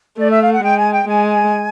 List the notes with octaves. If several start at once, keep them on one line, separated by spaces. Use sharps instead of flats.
A3 D5
E5
F5
F#5
G#3 G5
G#5
G5
G#3 G#5